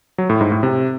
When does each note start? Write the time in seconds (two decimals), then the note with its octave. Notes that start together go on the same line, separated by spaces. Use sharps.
0.18 F#3
0.30 A2
0.41 G#2
0.52 A2
0.63 C3